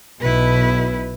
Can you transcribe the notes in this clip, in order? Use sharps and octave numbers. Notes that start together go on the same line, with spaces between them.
B1 B2 E4 B4